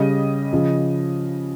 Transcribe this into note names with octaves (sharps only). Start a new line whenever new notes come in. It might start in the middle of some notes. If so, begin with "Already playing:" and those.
Already playing: C#3 G3 D#5
C#3 F3